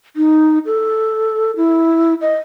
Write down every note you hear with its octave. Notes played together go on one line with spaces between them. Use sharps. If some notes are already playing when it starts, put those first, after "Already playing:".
D#4
A4
E4
D#5